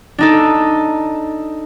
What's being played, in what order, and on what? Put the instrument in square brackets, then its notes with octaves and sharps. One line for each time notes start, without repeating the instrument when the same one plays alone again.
[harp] D4 D#4 A4